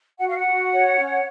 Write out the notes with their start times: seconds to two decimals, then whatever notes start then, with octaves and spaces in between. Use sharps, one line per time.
0.18 F#4 F#5
0.27 F5
0.36 F#5
0.46 F#4
0.73 C#5
0.99 C#4